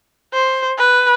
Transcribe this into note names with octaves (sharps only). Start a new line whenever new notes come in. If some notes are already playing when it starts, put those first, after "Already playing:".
C5
B4